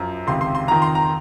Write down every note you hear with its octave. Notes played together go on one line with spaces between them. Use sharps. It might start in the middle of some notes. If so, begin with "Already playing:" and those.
Already playing: F#2 F3 A#5
C#2 C3 D#3 C6
C6
C6
F2 D#3 A#5
C6
A#5